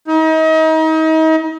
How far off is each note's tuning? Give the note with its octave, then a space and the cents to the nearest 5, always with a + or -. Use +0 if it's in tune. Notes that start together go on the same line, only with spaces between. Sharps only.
D#4 +35